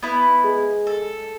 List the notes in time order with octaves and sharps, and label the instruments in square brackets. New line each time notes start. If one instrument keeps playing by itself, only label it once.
[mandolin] B3 E4
[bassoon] G#3
[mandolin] A4